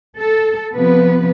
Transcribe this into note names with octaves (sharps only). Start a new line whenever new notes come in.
A4
C3 F3 B3 B4